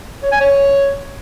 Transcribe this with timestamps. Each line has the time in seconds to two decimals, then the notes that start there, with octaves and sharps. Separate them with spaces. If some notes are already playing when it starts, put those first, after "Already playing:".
0.23 C#5
0.32 G#5
0.41 C#5